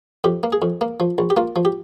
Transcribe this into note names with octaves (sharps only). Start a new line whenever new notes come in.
F2 G4
A#3
G#4
F2
A#3
F3
A#1
G4
A#3 F4
F3
G4